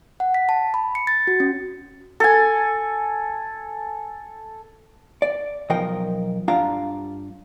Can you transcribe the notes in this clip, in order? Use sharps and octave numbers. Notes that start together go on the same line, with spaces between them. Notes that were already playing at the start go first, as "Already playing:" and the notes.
F#5
B6
A5
B5
C#7
A6
F#4
C#4
A4 G#5
D5
B1 F3 A#4 D#5 G5
G2 D4 F4 F5 A#5